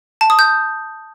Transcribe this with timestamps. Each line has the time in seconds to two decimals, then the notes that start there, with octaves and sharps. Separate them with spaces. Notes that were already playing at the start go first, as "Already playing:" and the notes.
0.21 A5
0.30 D#6
0.39 G6